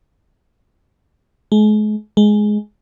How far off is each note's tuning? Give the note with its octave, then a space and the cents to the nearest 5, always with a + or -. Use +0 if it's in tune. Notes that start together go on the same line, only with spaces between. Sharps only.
G#3 +40
G#3 +10